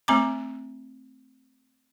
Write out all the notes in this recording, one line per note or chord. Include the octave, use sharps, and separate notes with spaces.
A3 C4 A#5 D6